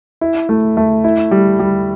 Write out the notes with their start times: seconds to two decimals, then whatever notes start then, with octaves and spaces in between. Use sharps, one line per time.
0.21 E4
0.49 A3
0.77 A3
1.04 E4
1.31 G3
1.59 G3